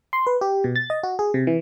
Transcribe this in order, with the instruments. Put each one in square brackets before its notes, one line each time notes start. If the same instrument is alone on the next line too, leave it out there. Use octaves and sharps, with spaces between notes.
[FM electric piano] C6
B4
G4
B2
A6
D#5
F#4
G#4
C3
E3